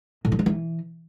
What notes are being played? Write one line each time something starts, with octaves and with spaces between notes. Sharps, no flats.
A2
F#3
D#3
E3